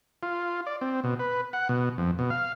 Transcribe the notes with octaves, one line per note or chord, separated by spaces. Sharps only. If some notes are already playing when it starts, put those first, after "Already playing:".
F4
D5
C4
B2
B4
F#5
B2
F2
B2
F5